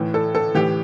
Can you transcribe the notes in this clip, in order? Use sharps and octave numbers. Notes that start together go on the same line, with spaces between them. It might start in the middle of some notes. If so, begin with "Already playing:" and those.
Already playing: A2 E3
A4
A4
A2 E3 G4